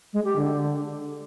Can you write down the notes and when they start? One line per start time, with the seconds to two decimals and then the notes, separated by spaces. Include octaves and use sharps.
0.13 G#3
0.25 G4
0.36 D3